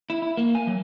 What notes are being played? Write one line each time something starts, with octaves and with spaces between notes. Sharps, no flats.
E4
E4
A#3
G#5
F#3